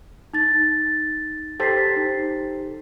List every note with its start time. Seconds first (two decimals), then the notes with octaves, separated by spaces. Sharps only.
0.34 D#4 A6
1.60 G4 A4 C5 A6 B6 C7
1.96 D#4